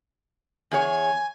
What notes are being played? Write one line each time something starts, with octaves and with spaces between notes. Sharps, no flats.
E2 G#4 C#5 G#5